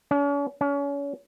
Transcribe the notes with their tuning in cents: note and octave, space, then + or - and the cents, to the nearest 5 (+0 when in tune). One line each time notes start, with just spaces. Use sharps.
C#4 +45
C#4 +35